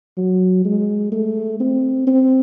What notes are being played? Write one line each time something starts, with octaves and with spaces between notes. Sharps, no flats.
F#3
G#3
A3
C4
C4